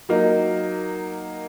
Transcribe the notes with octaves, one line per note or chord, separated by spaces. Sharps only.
F#3 A#3 D#4